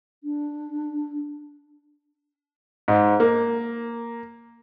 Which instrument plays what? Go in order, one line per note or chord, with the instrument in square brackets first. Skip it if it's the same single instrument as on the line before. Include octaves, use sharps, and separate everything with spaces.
[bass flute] D4
[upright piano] G#2
A#3